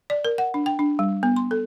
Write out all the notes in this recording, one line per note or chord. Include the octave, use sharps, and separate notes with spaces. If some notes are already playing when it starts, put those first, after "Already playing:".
D5
A#4
F#5
D4
G5
D4
G3
B3
C6
A4